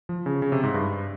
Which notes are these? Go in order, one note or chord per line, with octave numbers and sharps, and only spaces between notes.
F3
C#3
C#3
C3
G#2
G2